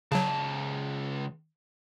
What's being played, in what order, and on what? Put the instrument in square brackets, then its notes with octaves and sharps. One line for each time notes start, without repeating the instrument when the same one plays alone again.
[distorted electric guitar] C#2 A5 [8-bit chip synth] C#3 F#3